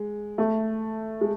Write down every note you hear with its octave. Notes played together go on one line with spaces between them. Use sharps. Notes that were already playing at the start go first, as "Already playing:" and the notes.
Already playing: G#3
A3
G#3